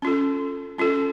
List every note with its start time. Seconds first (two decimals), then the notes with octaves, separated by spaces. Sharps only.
0.02 C#4 F4 A4
0.78 C#4 F4 A4